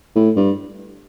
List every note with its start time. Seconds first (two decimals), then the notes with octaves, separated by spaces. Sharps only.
0.16 A2
0.36 G2